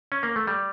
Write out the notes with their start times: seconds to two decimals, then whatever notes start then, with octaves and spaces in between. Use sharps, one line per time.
0.12 C#4
0.23 A#3
0.36 A3
0.47 G3